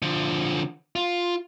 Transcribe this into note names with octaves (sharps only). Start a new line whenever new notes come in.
D3 F3
F4